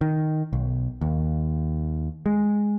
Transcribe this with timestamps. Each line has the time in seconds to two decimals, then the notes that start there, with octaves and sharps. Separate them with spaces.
0.01 D#3
0.53 B1
1.01 D#2
2.26 G#3